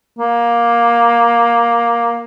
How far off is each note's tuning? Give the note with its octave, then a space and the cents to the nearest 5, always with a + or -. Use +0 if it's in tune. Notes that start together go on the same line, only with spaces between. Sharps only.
A#3 +10